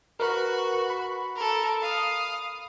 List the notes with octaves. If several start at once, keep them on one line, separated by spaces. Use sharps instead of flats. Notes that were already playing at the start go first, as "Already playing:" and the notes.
F#4 A#4 B4
B5
A4 A#4
F5 D#6